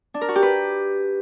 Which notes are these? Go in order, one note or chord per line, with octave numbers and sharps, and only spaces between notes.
D4
A#4
F#4
G4
B4